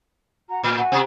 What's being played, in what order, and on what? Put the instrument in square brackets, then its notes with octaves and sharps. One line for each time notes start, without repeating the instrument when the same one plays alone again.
[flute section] F#4 A#5
[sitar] A2 [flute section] G#5 F6
[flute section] F#4 F#5 G#5
[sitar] C3 C4